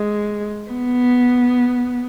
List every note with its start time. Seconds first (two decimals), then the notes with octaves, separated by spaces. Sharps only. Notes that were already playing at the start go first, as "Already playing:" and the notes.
Already playing: G#3
0.73 B3